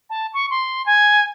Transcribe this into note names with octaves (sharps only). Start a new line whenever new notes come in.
A5
C#6
C6
G#5